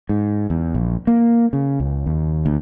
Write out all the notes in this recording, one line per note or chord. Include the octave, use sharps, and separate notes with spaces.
G#2
E2
A#1
A#3
C#3
C#2
D#2
D2